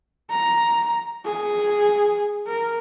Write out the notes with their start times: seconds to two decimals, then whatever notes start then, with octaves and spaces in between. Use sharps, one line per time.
0.31 A#5
1.25 G#4
2.47 A#4